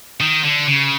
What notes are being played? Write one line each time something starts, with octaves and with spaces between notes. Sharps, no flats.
D#3
D3
C#3